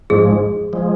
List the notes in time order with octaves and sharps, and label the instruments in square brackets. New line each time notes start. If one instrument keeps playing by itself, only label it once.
[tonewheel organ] G#2 F3 G#3 [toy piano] G#4
[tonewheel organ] F3 G#3